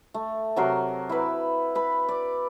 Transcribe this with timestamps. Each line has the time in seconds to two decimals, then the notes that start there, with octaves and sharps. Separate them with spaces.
0.14 A3
0.56 C3 F#3 A#4 C6
1.09 E4 B4
1.75 B4 B5
2.09 D5